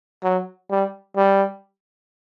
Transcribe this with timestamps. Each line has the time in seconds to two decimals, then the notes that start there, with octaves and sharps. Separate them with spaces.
0.23 F#3
0.70 G3
1.16 G3